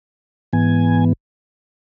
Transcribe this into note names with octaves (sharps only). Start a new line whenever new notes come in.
G#2 E3 B3 G#5